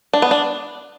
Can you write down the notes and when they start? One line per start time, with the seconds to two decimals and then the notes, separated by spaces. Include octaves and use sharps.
0.14 D4
0.22 B3
0.31 D4